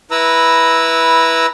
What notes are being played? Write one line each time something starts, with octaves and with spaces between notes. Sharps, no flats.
E4 B4 A#5 E6